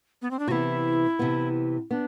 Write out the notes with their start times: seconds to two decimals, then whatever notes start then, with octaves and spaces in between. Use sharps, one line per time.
0.22 B3
0.31 C4
0.39 D4
0.47 C3 E3 B3 E4 F#4
1.19 C3 E3 B3
1.90 B3 D4